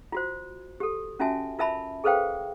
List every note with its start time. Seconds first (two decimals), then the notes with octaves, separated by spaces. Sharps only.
0.12 F4 F#4 C5
0.80 G4 A4
1.20 C#4 F4 F#4 E5 G#5 A5
1.59 F4 A#4 E5 A5 B5
2.04 G#4 A4 B4 C5 F5 G5